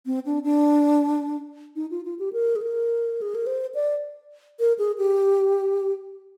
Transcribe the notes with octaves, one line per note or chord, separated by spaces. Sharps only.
C4
D4
D4
D#4
F4
F4
G4
A#4
G#4
A#4
G#4
A#4
C5
D5
A#4
G#4
G4